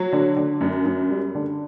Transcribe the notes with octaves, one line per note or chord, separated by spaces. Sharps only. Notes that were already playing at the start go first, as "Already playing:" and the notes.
Already playing: F#3
D3
D3
F#2
F#2
G3
D3